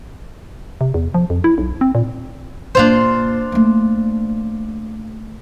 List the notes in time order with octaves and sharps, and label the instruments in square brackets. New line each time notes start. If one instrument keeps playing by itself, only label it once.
[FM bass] C3
E2
F3
F2
E4
B1
C4
A#2
[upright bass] A#2 A#3 [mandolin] D4 F4 C5
[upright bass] A3 A#3